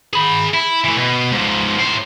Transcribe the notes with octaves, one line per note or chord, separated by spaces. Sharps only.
G#4 B5
E4
E3 A3
B2
G#2 F3
A2 C5